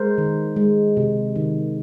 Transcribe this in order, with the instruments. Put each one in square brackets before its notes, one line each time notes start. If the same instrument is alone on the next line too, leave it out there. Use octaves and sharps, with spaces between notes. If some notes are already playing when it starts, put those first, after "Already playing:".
Already playing: [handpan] G#3 A#4 C5
D#3
G#3
C3
D#3